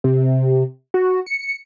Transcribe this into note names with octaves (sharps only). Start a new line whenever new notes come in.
C3
F#4
C#7